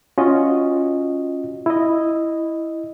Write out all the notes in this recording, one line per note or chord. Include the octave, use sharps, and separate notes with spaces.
C#4 F4 F#4 D#5
E4 D#5